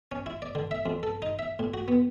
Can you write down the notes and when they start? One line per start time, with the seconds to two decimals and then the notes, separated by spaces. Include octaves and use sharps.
0.12 C#4
0.26 E4
0.42 D5
0.55 D3
0.71 E5
0.86 F2
1.03 A4
1.22 D#4
1.39 E5
1.59 A2
1.74 F#4
1.88 B3